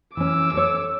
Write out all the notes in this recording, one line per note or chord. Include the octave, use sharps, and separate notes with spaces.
E3 C#4 D6 E6
A4 C#5